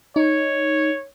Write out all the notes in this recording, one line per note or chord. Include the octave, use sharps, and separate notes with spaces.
D#4 C#5